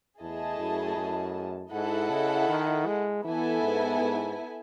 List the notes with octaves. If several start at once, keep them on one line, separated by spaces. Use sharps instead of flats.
E2 A3 E4 G#4 D#5 A5
F#2
F#2
G#2 E4 A4 D#5 F#5
C#3
D#3
G#3
E3 B3 E4 A4 E5 G#5
G#2
G#2